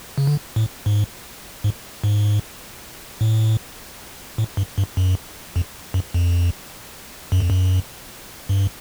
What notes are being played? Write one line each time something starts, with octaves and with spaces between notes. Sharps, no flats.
C#3
D3
A2
G#2
G#2
G#2
A2
A2
G2
G2
F#2
F2
F#2
F2
F#2
F2
F#2
G2